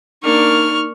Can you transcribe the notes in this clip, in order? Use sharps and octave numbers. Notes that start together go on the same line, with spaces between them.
A#3 D4 D#4 C#6 F6